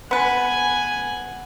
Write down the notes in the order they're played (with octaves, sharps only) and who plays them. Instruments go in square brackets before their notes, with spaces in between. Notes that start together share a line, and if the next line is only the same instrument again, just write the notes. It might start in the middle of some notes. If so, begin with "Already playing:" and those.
[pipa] B3 B4 [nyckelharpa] F#5 G#5